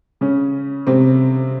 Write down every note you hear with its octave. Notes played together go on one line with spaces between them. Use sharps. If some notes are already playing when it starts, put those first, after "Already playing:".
C#3 C#4
C3 C4